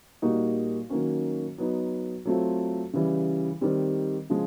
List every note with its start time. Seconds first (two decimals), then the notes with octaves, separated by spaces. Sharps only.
0.22 A#2 G3 A#3 D#4 F#4
0.90 D#3 F#3 A#3 C#4 F#4
1.58 F#3 B3 D#4
2.25 F#3 A3 C4 F4
2.93 C#3 E3 G3
3.61 D#3 G3 C4
4.30 C#3 F3 G#3